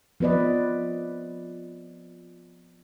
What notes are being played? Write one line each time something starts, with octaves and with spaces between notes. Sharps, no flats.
F3 B3 B4 D5 D#5